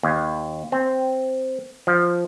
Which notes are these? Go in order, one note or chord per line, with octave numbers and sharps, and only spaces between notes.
D#2
C4
F3